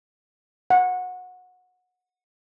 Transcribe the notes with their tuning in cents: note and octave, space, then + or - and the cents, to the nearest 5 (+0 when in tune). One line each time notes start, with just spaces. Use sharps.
F#5 -20